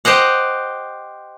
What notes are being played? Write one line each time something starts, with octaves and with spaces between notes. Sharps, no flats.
G4 C5 D#5 F#5